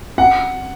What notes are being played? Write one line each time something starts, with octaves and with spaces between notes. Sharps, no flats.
F#5